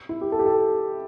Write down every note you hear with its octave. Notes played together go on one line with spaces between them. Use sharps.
E4
G4
A4
G4
A4